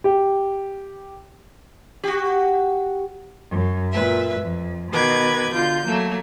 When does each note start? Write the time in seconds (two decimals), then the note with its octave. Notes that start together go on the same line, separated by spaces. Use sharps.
0.04 G4
2.03 F#4 G4
3.49 F#2
3.91 A#2 B4 E5
4.40 F2
4.91 B2 D#3 B4 D6 G#6
5.53 D3 F4 G6
5.87 F#3 A3 A#3